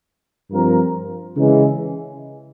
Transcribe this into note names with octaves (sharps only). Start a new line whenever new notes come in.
G2 F3 C4 F4 A#4
C#3 E3 G#3